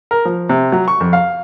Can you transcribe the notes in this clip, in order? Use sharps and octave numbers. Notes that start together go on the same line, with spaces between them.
A#4
F3
C3
F#3
C#6
F2
F5